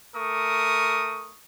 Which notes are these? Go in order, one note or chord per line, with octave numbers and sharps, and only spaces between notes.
A3 A#4 C#6 D#6